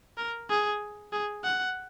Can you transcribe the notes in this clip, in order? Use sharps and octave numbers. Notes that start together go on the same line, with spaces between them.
A#4
G#4
G#4
F#5